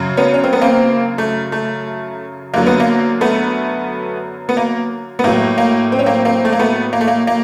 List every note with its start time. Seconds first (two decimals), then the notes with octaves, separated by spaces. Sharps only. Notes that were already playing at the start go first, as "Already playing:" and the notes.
Already playing: F#2 C#3 F#3
0.17 B3 C#4
0.34 C#4
0.44 C4
0.53 B3
0.61 A#3 C4
1.18 A3
1.52 A3
2.54 F#2 D3 F#3 A#3
2.66 B3
2.80 A#3
3.21 A3 B3
4.49 B3
4.57 A#3
5.19 B3
5.24 A2 F#3 A#3
5.58 A#3
5.92 C4
5.99 C#4
6.06 A#3 C4
6.25 A#3 C4
6.45 A3
6.52 A#3
6.59 A3 B3
6.93 A#3
7.01 A3
7.08 A#3
7.27 A#3